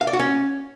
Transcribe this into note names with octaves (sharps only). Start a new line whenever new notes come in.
F5
D5
F#4
C#4